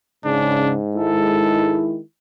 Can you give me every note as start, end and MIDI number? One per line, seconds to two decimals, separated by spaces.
0.25 1.83 44
0.25 0.75 49
0.25 0.73 62
0.96 1.99 51
0.96 1.99 56
0.96 1.99 64
0.96 1.87 69